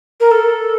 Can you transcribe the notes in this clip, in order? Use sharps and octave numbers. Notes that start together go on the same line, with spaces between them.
A#4
A4